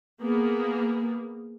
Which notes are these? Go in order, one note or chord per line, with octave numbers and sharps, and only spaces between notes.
A#3 B3 G#4